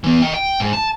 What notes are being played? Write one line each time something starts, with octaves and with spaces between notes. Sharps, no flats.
E3 B3
D#5 G5
G5
G#2
A5